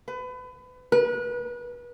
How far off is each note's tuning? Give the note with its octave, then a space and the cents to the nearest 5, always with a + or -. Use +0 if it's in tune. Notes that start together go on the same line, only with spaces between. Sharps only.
B4 +30
B4 -30